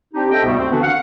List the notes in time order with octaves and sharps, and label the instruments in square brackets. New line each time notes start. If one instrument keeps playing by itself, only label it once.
[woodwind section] C4 D4 D#4 G4
C4 A4 D#5 E5 G5
D2 G#2 C3 G3 A3 B3
C4
D3 E3 B3 D4 F#4 B4
F5 F#5